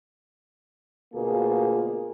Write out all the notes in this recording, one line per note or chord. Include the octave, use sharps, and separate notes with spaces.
D2 B2 A#3 F4 G#4